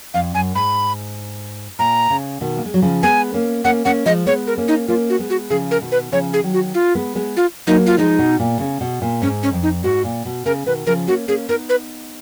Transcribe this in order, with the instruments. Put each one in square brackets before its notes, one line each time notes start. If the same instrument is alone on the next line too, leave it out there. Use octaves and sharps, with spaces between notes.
[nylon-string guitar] F2 [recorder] F5
[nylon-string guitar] F#2 [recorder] G#5
[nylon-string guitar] G#2 [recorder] B5
[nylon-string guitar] A#2 [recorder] A#5
[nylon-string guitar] C#3
B2 D#3
A#3
G#3
F#3
C#3 F3
[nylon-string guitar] G#3 B3 [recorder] G#5
[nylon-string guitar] A#3 C#4
[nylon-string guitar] A#3 C#4 [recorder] F#5
[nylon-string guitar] A#3 C#4 [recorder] F#5
[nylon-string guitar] F3 G#3 [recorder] D#5
[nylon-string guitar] G#3 B3 [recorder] C#5
[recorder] A#4
[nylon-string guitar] A#3 C#4
[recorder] D#4
[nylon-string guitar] A#3 C#4 [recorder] F4
[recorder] F#4
[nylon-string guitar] G#3 B3
[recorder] F#4
[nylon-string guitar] C#3 F3 [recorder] G#4
[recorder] A#4
[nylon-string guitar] B2 D#3
[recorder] B4
[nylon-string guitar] C#3 F3 [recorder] C#5
[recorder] G#4
[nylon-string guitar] D#3 F#3
[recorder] F#4
F4
[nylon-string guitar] G#3 B3
G#3 B3
[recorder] F4
[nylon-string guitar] F#3 A#3 [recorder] D#4
[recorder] F4
[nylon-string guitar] F3 G#3 [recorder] D#4
[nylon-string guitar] B2
A#2
C#3
B2
A#2
[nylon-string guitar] G#2 [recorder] C#4
[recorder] C#4
[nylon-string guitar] F2
[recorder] D#4
[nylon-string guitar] G#2 [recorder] F#4
[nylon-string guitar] A#2
B2
[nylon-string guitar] C#3 [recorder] A#4
[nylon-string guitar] B2 D#3 [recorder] B4
[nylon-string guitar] C#3 F3 [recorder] A#4
[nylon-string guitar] A#3 C#4 [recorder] F#4
[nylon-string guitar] A#3 C#4 [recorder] G#4
[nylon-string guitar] B3 D#4 [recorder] A#4
[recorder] B4